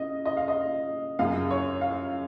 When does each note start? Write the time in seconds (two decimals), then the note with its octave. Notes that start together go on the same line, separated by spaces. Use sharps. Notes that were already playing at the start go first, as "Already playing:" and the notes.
Already playing: C#3 D#5
0.26 D#5
0.37 F5
0.48 D#5
1.19 F#2 C#3 F5
1.51 C#5
1.81 F5